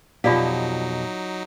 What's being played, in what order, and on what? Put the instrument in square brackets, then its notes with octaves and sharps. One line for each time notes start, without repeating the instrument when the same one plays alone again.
[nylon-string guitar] F2 B2 G4 [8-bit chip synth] F#3 D#4 [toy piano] F4 D5 F5